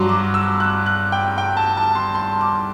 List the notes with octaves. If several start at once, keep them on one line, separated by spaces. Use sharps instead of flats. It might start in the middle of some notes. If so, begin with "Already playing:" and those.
Already playing: G2 F#3 C6
D6
E6
F#6
F#6
G5
G5
A5
A5
C6
C6
D6